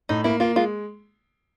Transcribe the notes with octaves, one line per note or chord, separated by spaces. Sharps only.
A2 D#4
A#3 E4
A#3 F4
G#3 F4